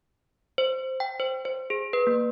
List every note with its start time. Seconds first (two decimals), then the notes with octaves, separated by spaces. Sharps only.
0.58 C5
1.00 G5
1.20 C5
1.45 C5
1.70 G#4
1.93 B4
2.07 A#3